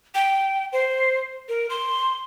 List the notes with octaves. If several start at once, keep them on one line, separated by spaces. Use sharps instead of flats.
G5
C5
A#4
C6